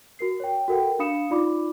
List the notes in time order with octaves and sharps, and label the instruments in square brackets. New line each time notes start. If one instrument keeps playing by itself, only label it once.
[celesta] F#4 A#4 C7
C#5 G5
F#4 A4 A#4 F#5 G5
D4 F5 B5 D#6 C#7 E7
D#4 F4 D5 B5 D6